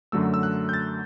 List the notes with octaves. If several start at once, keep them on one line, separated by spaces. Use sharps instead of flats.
F#2 D3 F#3 A3 E6
E6
F#6
G6
A6